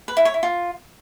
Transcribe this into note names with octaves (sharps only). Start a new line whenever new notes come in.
B4
E4
C#5
E4
F4